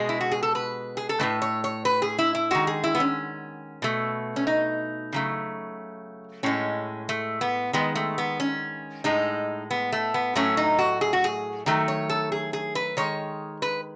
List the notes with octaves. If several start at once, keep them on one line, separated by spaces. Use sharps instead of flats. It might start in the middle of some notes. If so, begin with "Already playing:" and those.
Already playing: B2 G#3 G#4
E4
F#4
G#4
A4
B4
G#4
A4
A2 E3 A3 B4
C#5
C#5
B4
G#4
E4
E4
D#3 G#3 F#4
G#4
E4
B3
C#4
B2 A3
C#4
D#4
C#3 F#3 A3
A2 G#3 C#4
A3
B3
D#3 G#3 B3
A3
B3
C#4
A2 G#3 D#4
B3
A3
B3
A2 F#3 A3 C#4
D#4
F#4
G#4
F#4
G#4
D#3 F#3 A3
C#5
A4
G#4
G#4
B4
D#3 G#3 C#5
B4